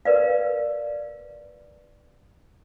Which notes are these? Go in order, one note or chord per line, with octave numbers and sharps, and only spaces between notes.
A#4 B4 D5 F5